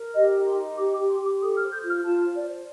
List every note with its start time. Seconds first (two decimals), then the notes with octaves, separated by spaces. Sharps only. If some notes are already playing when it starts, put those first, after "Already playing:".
Already playing: A#4
0.13 G4 D#5
0.34 D#4
0.45 C6
0.55 D#4
0.77 G4 D6
0.93 D6
0.97 G4
1.08 C6
1.19 G4
1.24 D6
1.40 A4 D#6
1.56 F6
1.61 C5
1.72 G6
1.82 F4
1.87 F6
2.04 F4 A5
2.24 C5
2.35 D5
2.45 C5